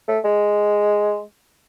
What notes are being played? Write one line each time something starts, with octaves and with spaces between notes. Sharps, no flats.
A3
G#3